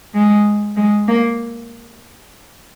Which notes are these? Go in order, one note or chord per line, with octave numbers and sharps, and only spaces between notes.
G#3
G#3
A#3